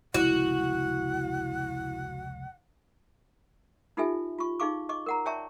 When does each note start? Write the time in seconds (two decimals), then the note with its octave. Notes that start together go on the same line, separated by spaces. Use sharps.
0.14 F1 C#2 C#3 E4 F#4 F#5
3.97 D#4 F4 G4 A4 E5 G#5
4.39 F4 C#6
4.60 D#4 G#4 F5 C#6 D6
4.89 D#5 C#6 D6
5.06 A#4 F#5 A#5
5.26 C#5 D5 E5 G5 A5 C#6